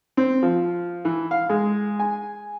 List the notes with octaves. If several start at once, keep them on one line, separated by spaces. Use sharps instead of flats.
C4
F3
E3
F5
G#3
G#5